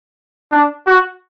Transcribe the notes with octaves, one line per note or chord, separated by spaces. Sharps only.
D4
F#4